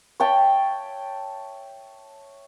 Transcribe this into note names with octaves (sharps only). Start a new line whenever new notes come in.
C#5 E5 G5 A5